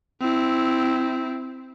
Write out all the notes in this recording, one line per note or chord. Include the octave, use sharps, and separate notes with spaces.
C4 E4